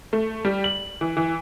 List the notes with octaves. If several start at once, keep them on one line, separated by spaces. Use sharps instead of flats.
A3
G3
F#7
E3
E3